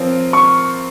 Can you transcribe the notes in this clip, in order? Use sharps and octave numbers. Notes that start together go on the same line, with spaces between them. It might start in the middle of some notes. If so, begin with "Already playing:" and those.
Already playing: F3 C4 F4 A#4 C#5
C#6